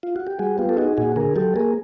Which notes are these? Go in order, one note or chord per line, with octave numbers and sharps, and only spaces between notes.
F4
F#4
G4
G3 F#4 G#4
B3 F4 G4
A4
D#4 F#4 G#4
A#2 F#4 G#4
D3 G#4 A#4
F#3 G4 A4
A#3 G#4 A#4